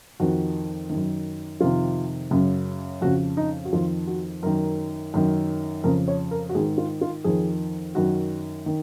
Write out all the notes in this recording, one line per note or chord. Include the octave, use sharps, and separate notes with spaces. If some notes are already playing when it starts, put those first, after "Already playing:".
F2 D#3 F#4
D#3
F#2
F2 C3 D#3 F4
F#2 C#3
F2 C#3 F#4
D#4
F#4
F2 D#3 F4
F#4
F#2 D#3 A#4
F#2 D#3
F2 C#3 A#4
C#5
A#4
F#4
G#2 D#3 G#4
F4
F4
F2 D#3 G#4
F#2 D#3 F#4
D#3